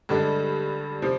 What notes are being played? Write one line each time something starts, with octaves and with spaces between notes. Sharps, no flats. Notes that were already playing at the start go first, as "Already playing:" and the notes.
G2 D3 G#3 D4
C3 F3